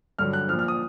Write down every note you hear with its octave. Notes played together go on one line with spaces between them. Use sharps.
G2 D3 F#3 F6
F#6
F3 F6
A#2
F6
D#6